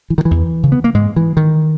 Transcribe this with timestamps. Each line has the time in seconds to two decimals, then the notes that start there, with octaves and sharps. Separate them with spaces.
0.10 E3
0.18 D#3
0.25 E3
0.31 E2
0.63 C#3
0.72 B3
0.84 A#3
0.94 G#2 G#3
1.16 E3
1.37 D#3